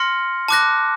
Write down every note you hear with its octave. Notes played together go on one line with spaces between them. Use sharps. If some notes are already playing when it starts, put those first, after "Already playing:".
Already playing: C6 F6 A#6 C#7
A5 D6 F#6 A#6